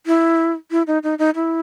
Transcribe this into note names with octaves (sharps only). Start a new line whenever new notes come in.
E4
E4
D#4
D#4
D#4
E4